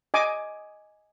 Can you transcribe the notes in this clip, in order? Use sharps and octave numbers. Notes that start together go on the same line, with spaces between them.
D#5 G#5 D6